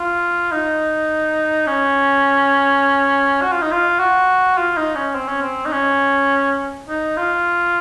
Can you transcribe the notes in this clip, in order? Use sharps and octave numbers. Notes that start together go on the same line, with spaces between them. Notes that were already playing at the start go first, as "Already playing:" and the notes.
Already playing: F4
D#4
C#4
F#4
F4
D#4
F4
F#4
F4
D#4
C#4
C4
C#4
C4
D#4
C#4
D#4
F4